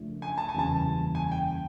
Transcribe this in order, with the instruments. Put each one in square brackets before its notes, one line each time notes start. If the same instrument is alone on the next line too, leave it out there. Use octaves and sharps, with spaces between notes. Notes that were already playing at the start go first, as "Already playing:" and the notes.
Already playing: [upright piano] F#2 C#3 F3 A3 D4
[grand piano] G#5
A5
G#5
[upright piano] F#1 E2 C#3 E3 G3 [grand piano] A5
[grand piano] G#5
G5